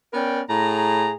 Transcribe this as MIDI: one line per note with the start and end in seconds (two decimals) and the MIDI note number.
0.13 0.41 59
0.13 0.41 61
0.13 0.41 70
0.13 0.41 74
0.13 0.41 79
0.48 1.14 45
0.48 1.14 68
0.48 1.14 82